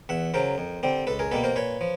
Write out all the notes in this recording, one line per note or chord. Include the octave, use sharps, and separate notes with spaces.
E2 E5 F#5
C#3 F#3 A#4 C5
F2
D3 G3 C4
C#2 A4 B4
G#4 A#4
B2 G3 A#3 A4 B4
A#4 C5
A#2 B4 C#5
F3